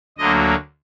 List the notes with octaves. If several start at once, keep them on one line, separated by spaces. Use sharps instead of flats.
D2 D3 F#3 A#3 D#5